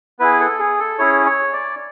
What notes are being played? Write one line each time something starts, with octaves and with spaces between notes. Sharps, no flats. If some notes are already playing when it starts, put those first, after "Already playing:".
B3 E4 G#4 B4
A4
G#4
A4
C#4 E4 G#4 C#5
C#5
D5